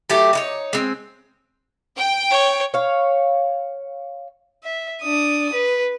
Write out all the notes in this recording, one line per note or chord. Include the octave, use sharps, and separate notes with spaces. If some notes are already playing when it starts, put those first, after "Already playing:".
F#3 A3 G4
D#4 E4 C#5
G#3 C4
G5
C#5
C#5 F5
E5
D4 D#6
B4